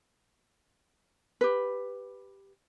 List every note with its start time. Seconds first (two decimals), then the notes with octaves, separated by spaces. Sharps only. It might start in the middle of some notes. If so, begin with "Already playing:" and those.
1.41 G4 B4